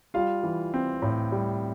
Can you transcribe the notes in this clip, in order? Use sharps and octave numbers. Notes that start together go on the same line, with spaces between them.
G3 F4 F5
E3
C4
A2
G3